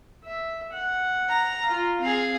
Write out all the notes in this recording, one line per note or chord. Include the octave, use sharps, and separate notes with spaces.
E5
F#5
A#5
F4 F5
C4 G#4 F5